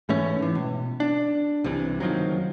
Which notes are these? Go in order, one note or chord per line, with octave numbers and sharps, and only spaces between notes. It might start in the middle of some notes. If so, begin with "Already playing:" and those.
G#2 E3 A3 C#4
G#2 E3
B2
D4
C2 G2 C3 E3
F#1 D#3 F3 F#3